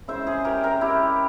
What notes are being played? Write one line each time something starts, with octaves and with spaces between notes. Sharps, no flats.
C#3 E3 G#3 C5 E5
G#4 C5
G4 A#4
G4 A#4
E4 G4